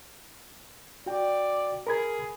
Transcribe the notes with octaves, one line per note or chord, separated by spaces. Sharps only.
F#4 D5 G5
G#4 A#4 B5 G#6